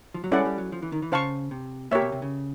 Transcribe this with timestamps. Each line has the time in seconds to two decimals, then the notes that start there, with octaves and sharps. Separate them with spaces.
0.14 F3
0.24 F#3
0.32 G3 C#4 E4 A4 D5 F#5
0.39 G#3
0.45 G3
0.58 F#3
0.72 F3
0.82 E3
0.92 D#3
1.02 E3
1.12 C#3 C5 F5 A5 C#6
1.51 C3
1.91 A#2 G4 A#4 C#5 E5
2.02 B2
2.12 C3
2.22 C#3